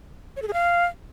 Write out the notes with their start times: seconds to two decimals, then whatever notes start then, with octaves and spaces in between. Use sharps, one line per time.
0.36 C#5
0.42 A4
0.48 G#4
0.53 F5